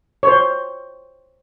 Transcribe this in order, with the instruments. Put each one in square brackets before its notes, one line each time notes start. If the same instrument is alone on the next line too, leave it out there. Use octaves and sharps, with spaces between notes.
[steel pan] C5 C#5